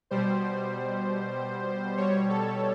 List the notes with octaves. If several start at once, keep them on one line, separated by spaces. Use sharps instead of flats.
B2 G3 C5
B2 G3 C#5
A4